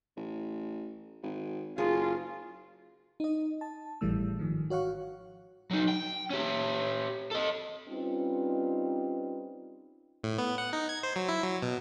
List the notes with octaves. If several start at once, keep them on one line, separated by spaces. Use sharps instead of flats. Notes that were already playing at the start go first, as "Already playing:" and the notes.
A1
G#1
F#1 F4 G#4
D#4 D#5
A5
G#1 A2 E3 G3 A3 E6
G#2 D#3 F3
F#4 C#5 F5 F#5 C#6
F#3 D#4
G5
C#4 G4
A4 D#5
G3 C4 C#4 D#4 F4 B4
A2
B3
F#5
D#4
G#6
C5
F#3
E4
F#3
B2